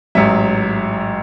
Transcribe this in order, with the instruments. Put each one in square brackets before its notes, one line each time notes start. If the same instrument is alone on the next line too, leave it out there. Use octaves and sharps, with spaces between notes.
[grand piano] A1 G#2 F#3 E5